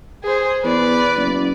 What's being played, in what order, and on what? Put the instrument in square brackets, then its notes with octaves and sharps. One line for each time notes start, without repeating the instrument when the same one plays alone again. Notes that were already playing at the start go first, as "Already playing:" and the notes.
[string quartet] G#4 C5
[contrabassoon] E2 [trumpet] B4 [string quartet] D5
[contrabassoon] F#1